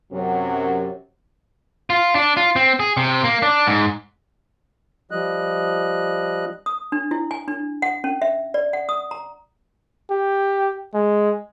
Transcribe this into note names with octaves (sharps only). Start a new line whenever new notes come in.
F#2 C3 F#3
F4
D4
F4
C4
G#4
C3
A#3
D4
G#2
F3 G3 D#5 F#6
D#6
D4
E4
G#5
D4
F#5
C#4
E5
D5
F#5
D#6
A#5
G4
G#3